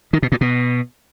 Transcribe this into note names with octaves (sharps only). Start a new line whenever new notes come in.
D#3
B2
A#2
B2